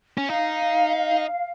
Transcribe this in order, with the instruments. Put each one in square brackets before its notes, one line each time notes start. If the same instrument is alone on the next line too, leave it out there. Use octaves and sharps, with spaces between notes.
[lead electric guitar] C#4
[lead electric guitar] D#4 [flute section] F5